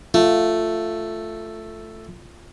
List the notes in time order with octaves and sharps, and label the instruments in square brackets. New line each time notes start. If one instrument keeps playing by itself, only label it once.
[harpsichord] A3 [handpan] F4